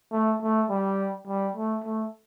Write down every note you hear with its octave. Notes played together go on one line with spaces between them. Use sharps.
A3
A3
G3
G3
A3
A3